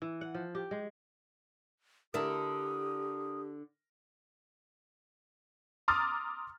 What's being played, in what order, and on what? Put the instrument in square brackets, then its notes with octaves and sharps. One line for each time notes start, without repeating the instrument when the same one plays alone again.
[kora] E3
F#5
F3
G4
G#3
[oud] D3 E4 A4 [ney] G4 [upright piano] A#4 [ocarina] D#6
[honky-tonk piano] A#5 C6 D6 D#6 F6 A6